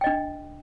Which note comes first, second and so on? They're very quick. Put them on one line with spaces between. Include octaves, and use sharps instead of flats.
G5 D#5 D4